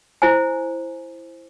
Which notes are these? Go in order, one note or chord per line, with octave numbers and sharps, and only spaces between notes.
E4 C5 G#5